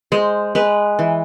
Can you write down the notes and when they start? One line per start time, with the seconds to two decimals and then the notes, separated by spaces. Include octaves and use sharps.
0.12 G#3 C5
0.55 G#3 B4
0.99 E3